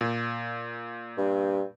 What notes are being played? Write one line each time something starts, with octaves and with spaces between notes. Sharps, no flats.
A#2
G2